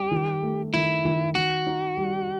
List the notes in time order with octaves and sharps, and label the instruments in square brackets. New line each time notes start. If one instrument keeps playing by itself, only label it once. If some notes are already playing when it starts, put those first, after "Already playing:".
Already playing: [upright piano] G3 [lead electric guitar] G4
[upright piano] D#3
A3
[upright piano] D#3 [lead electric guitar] E4
[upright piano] D#3
[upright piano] D#3 [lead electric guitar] F#4
[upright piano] D#4
G3